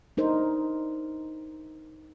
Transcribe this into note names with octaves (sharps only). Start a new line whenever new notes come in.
D4 D#4 A#4 C5